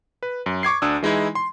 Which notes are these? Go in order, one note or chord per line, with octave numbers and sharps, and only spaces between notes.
B4
F#2
C#6 D6 G#6 C7
D2 D4 D#6 E6
E3 G#3 D#4 E4
C6